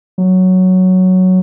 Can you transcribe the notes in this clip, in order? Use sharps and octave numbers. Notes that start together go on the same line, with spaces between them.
F#3